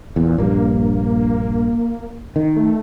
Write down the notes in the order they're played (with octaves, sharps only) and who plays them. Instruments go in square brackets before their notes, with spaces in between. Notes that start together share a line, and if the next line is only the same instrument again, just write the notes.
[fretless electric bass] E2 [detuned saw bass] A#2
[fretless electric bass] A#1 G2 [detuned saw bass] A#3
[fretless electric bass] D#3
[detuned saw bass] A3